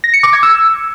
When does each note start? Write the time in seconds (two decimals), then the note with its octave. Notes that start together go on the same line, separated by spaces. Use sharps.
0.04 A#6
0.14 C#7
0.23 D6
0.33 G#6
0.43 E6